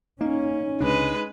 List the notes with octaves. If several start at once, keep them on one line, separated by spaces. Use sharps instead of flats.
A#3 C#4 D#4
C#2 C3 G#3 D4 B4